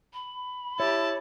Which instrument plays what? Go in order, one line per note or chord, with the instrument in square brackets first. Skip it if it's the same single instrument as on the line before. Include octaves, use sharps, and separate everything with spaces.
[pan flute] B5
[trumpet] E4 [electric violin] G4 A5 [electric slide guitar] C#5